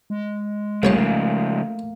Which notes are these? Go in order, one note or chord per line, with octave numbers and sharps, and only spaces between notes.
G#3
C2 C#3 F3 A3 A#3 C#5 A5